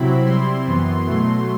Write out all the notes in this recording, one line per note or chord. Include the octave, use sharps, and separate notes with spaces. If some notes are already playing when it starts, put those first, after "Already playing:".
Already playing: C3 F#3 C4 E4 B5
C3 G3 C4 E4 C6
F#2 E3 B3
B2 F#3 A3 C6